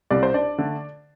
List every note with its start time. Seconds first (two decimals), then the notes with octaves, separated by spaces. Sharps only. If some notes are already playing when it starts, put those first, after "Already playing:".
0.11 C2 C3 G3 D5
0.23 C5
0.34 D4 D5
0.58 D3 A3